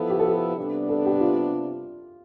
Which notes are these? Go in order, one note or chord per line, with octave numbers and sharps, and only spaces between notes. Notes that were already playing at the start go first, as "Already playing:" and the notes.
Already playing: F3 B3 E4 A4
G4
A4
G4
C3 G3 B3 D4
A4
G4
F4